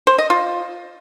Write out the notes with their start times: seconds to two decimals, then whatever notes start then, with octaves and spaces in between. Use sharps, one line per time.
0.07 C5
0.18 D#5
0.30 F4